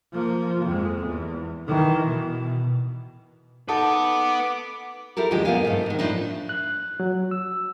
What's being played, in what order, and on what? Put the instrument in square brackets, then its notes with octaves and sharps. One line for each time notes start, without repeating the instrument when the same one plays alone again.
[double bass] F3 A#3
F2 G#3
E2
D#3 E3
B2
[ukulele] D#4 A4 [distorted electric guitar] B4 F#5 [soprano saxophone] D6
[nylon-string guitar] E4 G4 A4 A#4
D#2 D3 F3 G#3 G4
F#2 B2 B3 A#4 F5 G#5
G#2 A3
G#2 D#3
A2 F3 D4 D#4
[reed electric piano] F#6
F#3
E6